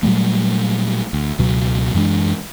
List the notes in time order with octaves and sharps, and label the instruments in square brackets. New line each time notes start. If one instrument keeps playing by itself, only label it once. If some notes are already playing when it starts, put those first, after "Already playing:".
[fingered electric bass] A#2 F#3 G3 A3
D2
C#2 B2 F#3
F#2 E3 G#3 D4